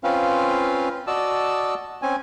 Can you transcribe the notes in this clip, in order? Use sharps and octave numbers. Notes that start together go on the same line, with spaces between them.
C4 C#4 F4 B4 F5
F#4 D5 D#5 A5 E6
C4 C#4 G#5